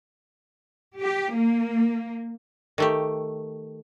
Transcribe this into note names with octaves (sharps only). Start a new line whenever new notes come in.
G4
A#3
D#3 A3 G4